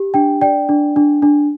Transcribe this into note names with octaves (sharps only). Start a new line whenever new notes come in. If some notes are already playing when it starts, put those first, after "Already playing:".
Already playing: G4
D4 G5
D5 G5
D4
D4
D4